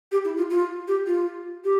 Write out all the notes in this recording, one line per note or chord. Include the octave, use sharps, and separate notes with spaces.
G4
E4
F4
F4
G4
F4
G4